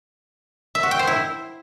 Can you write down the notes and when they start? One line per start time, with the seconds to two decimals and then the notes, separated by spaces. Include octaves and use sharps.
0.75 E5
0.83 F#4
0.91 G5
0.99 C5
1.07 E4